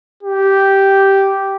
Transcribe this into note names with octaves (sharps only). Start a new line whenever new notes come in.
G4